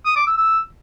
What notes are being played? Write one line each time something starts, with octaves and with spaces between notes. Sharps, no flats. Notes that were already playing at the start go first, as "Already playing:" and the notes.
D#6
D6
E6
E6